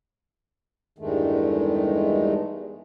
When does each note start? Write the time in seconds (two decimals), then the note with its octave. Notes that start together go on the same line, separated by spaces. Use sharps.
0.99 E2 G2 D#3 G#3 A3